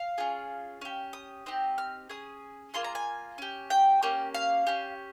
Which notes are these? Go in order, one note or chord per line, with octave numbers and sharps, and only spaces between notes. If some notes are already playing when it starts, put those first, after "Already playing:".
Already playing: F5
C#4 F4 G#4
C#4 G4
D#6
C4 D#4 G4
F6
C#4 G#4 D#6
A#3 F4 G#4 C6
A#5
G#5
C#4 G4
G5
A#3 C#4 G4
F5
C#4 G4